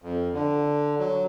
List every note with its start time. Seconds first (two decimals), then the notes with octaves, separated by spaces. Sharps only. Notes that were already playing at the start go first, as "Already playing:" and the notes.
0.02 F2
0.34 D3
0.99 F#3